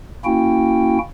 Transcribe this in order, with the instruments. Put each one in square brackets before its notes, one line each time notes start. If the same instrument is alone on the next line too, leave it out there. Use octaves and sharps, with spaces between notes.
[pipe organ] A#3 C#4 E4 F#4 G5